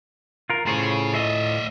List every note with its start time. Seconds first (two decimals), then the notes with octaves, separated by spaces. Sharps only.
0.50 F4 A#4
0.67 A2 F4 G#4 C5 C#5
1.14 D#5 E5